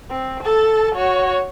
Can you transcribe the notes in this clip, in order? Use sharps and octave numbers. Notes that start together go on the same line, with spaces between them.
C4
A4 A5
F#4 C#5